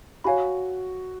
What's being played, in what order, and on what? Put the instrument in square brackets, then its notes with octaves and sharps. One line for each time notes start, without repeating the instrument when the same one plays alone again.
[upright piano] F#4 [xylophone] C#5 F5 G#5 B5